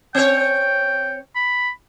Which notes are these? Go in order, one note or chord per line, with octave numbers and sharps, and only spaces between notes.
C4 C#5 G5
B5